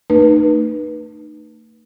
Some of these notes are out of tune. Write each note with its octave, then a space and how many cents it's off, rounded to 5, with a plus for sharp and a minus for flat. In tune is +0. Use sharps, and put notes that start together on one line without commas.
A3 +40 D#4 -35 B4 -25